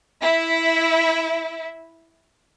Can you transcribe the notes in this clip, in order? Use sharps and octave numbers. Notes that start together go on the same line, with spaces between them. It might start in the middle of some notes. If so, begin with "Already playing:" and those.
E4 E5